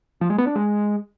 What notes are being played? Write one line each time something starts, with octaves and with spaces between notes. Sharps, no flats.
F3
G#3
B3
D4
G#3